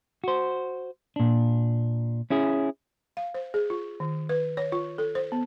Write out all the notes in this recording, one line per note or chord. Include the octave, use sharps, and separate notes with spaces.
F#4 C5
A#2 D4
C#4 E4 G#4
F5
C5
G#4
F4
D#3
B4
C#5
F4
A4
C5
B3